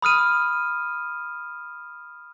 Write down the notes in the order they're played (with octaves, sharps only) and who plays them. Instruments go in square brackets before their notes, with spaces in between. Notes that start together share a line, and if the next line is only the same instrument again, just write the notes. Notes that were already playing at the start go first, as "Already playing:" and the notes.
[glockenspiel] B5 D#6 F6 D#7